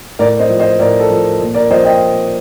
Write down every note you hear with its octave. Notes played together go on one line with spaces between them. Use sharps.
A2 A#4 D5
C5 D#5
F3
C5 D#5
A2 A#4 D5
A4
F3
A#2
A#4 D5
F3 C5 D#5
D#5 G5